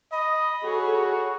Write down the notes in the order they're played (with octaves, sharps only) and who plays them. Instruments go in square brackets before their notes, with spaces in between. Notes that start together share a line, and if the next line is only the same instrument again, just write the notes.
[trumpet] D#5 [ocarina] B5
[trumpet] F#4 [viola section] G#4 A4 C#5